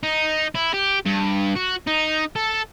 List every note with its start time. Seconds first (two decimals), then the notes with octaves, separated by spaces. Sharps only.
0.03 D#4
0.55 E4
0.74 G4
1.06 G2
1.56 F#4
1.87 D#4
2.36 A4